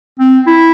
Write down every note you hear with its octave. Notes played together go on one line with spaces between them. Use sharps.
C4
E4